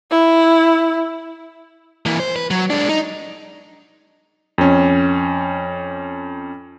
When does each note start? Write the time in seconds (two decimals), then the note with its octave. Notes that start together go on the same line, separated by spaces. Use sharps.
0.11 E4
2.06 E3 A#3
2.20 C5
2.36 B4
2.51 F#3
2.70 G#3 D4
2.89 D#4
4.58 F2 C#4